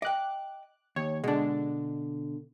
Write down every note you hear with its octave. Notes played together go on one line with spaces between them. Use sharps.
D#5 G5 D6 F#6
D#2 C#5
B2 D3 G#3 D4